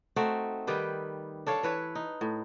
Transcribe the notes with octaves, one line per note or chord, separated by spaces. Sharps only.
A3 C4 D#4 F#4
D#3 G3 G4 B4
D4 A4 C#5 F5
E3 B4 C#5
D#4
A2